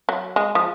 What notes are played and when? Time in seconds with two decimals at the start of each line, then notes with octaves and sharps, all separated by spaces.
0.09 F#3
0.36 G#3
0.55 F3